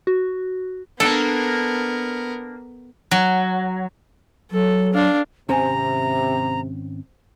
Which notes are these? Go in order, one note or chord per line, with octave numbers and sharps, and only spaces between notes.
F#4
A#3 B3 D4 A4 A#4
F#3
F#3 A4
D4 F5
G#1 C3 C4 C#4 C5 G#5 A#5